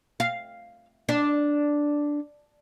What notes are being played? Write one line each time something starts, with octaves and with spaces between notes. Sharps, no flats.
F5
D4